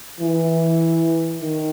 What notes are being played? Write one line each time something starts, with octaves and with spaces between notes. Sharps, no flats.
E3
D#3